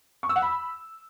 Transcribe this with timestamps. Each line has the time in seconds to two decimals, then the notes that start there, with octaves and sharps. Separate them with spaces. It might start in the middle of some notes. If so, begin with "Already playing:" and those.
0.23 C#6
0.29 E6
0.36 F#5
0.42 B5